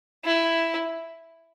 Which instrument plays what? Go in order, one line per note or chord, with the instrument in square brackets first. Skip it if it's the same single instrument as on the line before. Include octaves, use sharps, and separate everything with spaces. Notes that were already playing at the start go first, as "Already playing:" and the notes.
[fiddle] E4